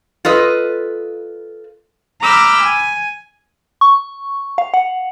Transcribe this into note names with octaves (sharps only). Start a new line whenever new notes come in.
F4 A4 B4 D#5
A#5 B5 D6 E6 F6 G6
G#5
C#6
F5
F#5